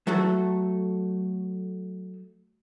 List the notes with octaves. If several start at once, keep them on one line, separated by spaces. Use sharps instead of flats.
F#3 A3 F#4 A4